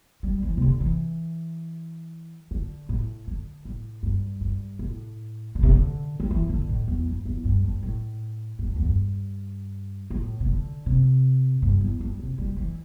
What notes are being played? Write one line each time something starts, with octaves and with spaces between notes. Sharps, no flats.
G3
E3
C3
D3
E3
D3
A2
D3
A2
G2
G2
A2
D3
C3
D3
G3
E3
D3
A2
E2
G2
E2
G2
G2
A2
A2
G2
E2
G2
A2
C3
D3
C3
G2
E2
G2
C3
G3
E3